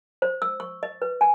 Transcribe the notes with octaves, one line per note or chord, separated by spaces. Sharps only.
C5
E6
C#6
D#5
B4
G#5